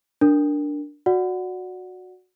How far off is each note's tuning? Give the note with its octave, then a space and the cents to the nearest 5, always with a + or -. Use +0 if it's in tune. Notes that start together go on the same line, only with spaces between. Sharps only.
D4 +0 A#4 +0
F#4 -15 D5 +0 F#5 +0